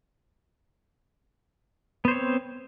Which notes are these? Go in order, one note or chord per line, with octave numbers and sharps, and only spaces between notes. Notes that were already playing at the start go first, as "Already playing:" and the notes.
B3 C4 C5 C#5